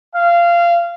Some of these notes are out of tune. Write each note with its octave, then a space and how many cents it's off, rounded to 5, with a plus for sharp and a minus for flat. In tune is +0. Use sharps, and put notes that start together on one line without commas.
F5 -20